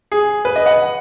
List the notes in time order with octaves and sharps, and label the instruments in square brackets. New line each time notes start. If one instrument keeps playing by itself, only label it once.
[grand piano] G#4
B4
D#5
F#5